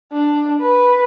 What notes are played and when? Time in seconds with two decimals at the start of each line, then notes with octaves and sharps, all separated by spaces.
0.12 D4
0.61 B4